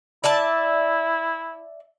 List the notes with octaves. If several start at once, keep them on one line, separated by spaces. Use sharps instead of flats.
E4 D5 E5 A5